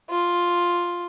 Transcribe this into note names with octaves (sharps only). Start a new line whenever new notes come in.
F4